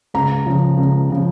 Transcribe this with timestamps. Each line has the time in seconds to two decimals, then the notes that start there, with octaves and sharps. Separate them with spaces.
0.14 C#2 A#5
0.46 C#3 F3
0.77 C#2
1.10 C#3 F3